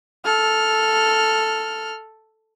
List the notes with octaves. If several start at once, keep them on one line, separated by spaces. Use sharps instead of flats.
A4 F6